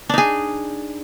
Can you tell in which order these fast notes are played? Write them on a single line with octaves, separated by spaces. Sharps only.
D4 D#4 G#4